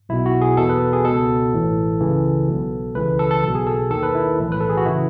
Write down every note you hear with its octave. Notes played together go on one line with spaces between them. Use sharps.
B1 B2 E4
F#4
G#4
E2 B2 A4
B4
G#4
C#2 B2 A4
A1 A2 E3
C#2 C#3 E3
B1 B2
C#2 C#3 E3 B4
A4
A4
B1 B2
G#4
A4
D#2 D#3 A4
B4
E4
B1 A2 E3
B4
A4
G#4
F#4
C#3 E3 E4